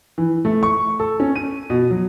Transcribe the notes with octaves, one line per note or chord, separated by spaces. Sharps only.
E3
A3
C#6
A4
C#4
D#7
B2
F#3